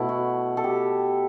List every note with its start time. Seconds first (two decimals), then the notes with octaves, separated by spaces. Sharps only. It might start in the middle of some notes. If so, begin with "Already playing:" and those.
Already playing: B2 A3 E4
0.09 F#4
0.57 A4
0.64 G4